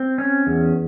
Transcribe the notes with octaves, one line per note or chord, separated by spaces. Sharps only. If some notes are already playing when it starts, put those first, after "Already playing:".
Already playing: C4
C#4
E2